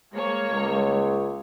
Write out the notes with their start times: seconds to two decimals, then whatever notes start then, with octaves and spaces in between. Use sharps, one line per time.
0.12 G#3 A#3 C#5
0.50 C#2